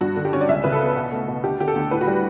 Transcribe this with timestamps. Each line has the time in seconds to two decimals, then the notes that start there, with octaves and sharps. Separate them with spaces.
0.01 G2 F#4
0.16 D3
0.25 G4
0.33 C#4 C#5
0.41 D5
0.49 C#2 E5
0.64 C#3 B4
0.72 A4
0.80 B3
0.96 B2
1.12 A3
1.28 B2
1.44 D2 G4
1.60 D3 G4
1.68 A4
1.76 D2
1.91 A2 B4
2.01 F#4
2.07 G3 G4